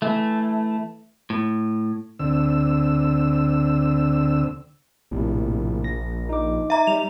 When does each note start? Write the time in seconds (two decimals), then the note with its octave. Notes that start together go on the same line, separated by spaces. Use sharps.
0.02 E3 A3
1.30 A2
2.19 D2 D3 C4 E6
5.11 A#1 A2 C3
5.84 A#6
6.29 D#4 D6
6.70 E5 A#5
6.87 G3 F7